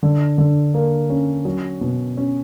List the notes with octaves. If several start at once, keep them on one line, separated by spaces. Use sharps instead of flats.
D3
D3
A#3
C#4
F#3
B2
C#4